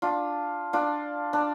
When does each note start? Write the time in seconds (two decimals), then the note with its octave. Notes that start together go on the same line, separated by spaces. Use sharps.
0.02 D4 F4
0.73 D4 F4
1.33 D4